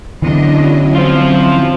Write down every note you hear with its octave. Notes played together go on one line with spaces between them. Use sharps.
E2 D3 E3 F#3 C#4 D4 E4 D#5
C4 F4 C5